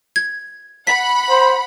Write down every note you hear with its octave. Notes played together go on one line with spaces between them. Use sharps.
G#6
F#5 B5 B6
C5